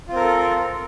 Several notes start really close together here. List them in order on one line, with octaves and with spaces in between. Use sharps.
F4 C4 A#4 A4